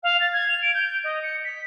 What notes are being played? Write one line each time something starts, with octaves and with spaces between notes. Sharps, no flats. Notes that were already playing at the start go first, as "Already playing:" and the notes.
F5
A6
G#6
F7
D7
G6
D#5
C#7
B6